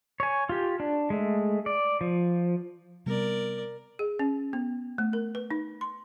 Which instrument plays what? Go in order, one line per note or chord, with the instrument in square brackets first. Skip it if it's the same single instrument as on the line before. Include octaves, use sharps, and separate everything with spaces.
[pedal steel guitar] C#5 G#5
F4 G4
D4
G#3 A3
D5
F3
[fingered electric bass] C3 G3 B3 [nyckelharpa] A#4 D5
[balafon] G#4
C#4
B3
A3
A#4
B4
D#4
C6